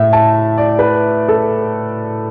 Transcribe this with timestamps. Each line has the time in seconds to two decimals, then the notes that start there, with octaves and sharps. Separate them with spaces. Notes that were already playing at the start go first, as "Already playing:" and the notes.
Already playing: A2 E5
0.13 A5
0.58 D5
0.79 B4
1.28 A4